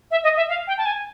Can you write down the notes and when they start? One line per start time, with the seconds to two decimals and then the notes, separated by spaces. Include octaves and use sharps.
0.11 E5
0.23 D#5
0.36 E5
0.48 F5
0.67 G5
0.77 A5
0.85 G#5